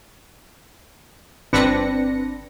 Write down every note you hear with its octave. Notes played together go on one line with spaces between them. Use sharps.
G1 C4 D4 B4 A#6 C#7